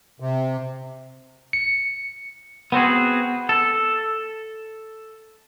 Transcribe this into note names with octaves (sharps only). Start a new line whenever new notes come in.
C3
C#7
B3 C4 F#4 G#4
A4